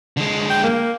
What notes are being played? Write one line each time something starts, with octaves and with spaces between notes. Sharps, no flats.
D3 G#3
G5
A#3